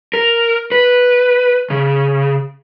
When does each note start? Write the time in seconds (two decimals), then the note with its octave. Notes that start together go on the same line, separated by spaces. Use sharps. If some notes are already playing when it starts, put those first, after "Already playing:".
0.14 A#4
0.72 B4
1.70 C#3